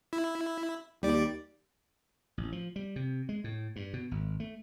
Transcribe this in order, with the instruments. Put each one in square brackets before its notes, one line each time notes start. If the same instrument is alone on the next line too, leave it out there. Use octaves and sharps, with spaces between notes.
[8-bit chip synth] E4
[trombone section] D#2 [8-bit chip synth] G3 D5
[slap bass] A1
F3
G3
C3
G#3
A2
G2
B2
G#1
A3